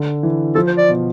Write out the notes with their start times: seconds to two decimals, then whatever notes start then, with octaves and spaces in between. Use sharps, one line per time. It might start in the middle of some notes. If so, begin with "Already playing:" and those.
Already playing: D3
0.23 E3
0.55 F3 A4
0.67 C5
0.78 D5
0.89 B2